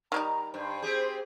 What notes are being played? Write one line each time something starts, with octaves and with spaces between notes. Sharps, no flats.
D#3 G3 D#4 A#5
G2 C5
C4 G4 G#4